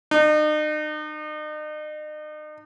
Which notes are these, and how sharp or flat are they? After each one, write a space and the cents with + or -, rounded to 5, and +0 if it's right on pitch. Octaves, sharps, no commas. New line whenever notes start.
D#4 -40